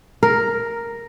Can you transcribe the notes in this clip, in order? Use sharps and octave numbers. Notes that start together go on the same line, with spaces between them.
A#4